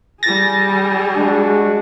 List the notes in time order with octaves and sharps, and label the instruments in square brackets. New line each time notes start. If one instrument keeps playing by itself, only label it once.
[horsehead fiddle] G3 G#4 [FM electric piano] A6 A#6
[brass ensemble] G#3 D4 F#4